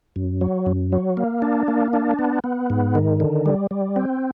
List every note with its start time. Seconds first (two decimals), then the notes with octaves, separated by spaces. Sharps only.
0.16 F#2
0.41 F#3
0.66 F#2
0.92 F#3
1.17 A#3
1.42 D4
1.68 A#3
1.93 D4
2.19 B3
2.44 B3
2.70 G#2
2.95 D#3
3.20 D3
3.46 G3
3.71 G3
3.96 C4